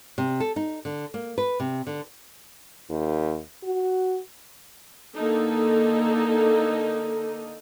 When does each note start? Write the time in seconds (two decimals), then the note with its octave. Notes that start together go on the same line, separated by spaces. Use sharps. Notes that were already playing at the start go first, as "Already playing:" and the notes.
0.18 C3
0.40 A4
0.56 D#4
0.85 D3
1.14 A#3
1.38 B4
1.60 C3
1.87 D3
2.89 D#2
3.63 F#4
5.15 D3 A#3 D#4 A4